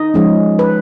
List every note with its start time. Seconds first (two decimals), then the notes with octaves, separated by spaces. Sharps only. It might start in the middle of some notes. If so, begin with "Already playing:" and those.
Already playing: D#4 D#5
0.14 F3 G#3 C#4
0.59 B4